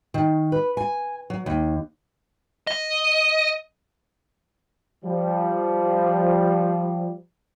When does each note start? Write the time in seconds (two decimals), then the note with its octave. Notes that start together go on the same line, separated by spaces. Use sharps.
0.14 D#3
0.52 B4
0.77 G#5
1.30 F#3
1.46 D#2
2.67 D#5
5.04 F3 G3